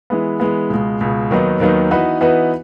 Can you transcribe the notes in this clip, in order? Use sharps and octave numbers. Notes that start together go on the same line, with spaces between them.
E3 G#3 B3
E3 G#3 B3
C#2 B2 G#3
C#2 B2 G#3
D#2 D#3 F#3 B3 D#4
D#2 D#3 F#3 B3 D#4
E3 B3 D#4 F#4 B4
E3 B3 D#4 F#4 B4